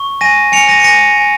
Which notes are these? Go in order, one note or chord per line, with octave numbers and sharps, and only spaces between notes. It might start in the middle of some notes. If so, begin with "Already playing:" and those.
Already playing: C#6
G#5 A#6 D#7
G#5 C#7 F7
A#6 D#7
C#7
G#5 A#6 D#7
G#5